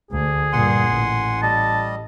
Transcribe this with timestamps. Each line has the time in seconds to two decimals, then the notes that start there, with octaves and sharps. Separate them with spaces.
0.11 D2 G#4
0.53 G2 A#2 F#5 G#5 C6
0.89 A1
1.42 G3 D#5 A5